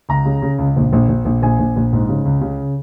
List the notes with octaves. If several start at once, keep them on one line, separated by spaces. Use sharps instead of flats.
C#2 A#5
C#3
C#3
C#2
A#1
A#1
A#1
A#1
A#1 G#5
A#1
A#1
G#2
C#3
C#2
C#3